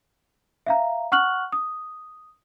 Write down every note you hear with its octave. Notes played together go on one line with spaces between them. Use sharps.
E5 F5 A#5
F#5 C#6 F6 F#6 F#7
D#6